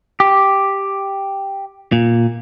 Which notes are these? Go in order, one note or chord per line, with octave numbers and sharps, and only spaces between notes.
G4
A#2